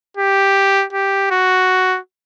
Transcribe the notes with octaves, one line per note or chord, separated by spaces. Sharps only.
G4
G4
F#4